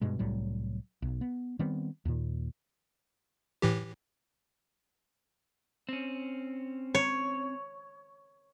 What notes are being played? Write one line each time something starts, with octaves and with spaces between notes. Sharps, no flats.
G2 B2 G#3
C2 A2 F#3 G3
B1
B3
D#3 G3 B3 C4
D#2 A#2
A2 E3 G4
C4 C#4
C#5